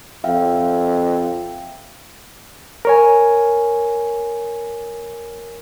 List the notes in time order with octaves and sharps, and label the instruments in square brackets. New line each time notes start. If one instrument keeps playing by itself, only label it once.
[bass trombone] F2 [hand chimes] E5 F5 G5
[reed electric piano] A#4 C#5 G#5